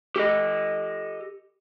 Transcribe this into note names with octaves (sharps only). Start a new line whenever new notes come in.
G4 A4 D#5